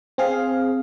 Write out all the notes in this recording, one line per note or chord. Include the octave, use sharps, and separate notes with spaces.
C4 G#4 F5